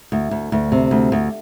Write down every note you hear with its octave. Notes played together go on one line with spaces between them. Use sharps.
D2
D2
D2
C3
D2
D2